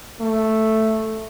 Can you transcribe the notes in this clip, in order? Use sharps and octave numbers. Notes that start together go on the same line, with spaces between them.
A3